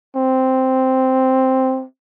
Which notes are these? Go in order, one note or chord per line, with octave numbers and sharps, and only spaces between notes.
C4